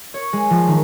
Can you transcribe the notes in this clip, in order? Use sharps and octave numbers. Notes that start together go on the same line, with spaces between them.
C#5
G#3
F3
D#3